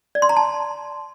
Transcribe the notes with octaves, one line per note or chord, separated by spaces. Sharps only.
D5
C6
A#5
A5